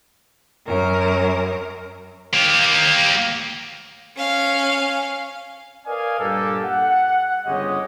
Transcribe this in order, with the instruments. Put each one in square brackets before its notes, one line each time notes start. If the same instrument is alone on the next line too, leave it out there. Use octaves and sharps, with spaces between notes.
[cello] F#2 A#4
[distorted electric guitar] A#3 G4
[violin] C#4 F5
[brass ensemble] A#4 B4 D5 D#5 F5 G#5
G2 A#2 A#3 G4 A4
F#5
G1 C#3 G#3 G4 C#5 D#5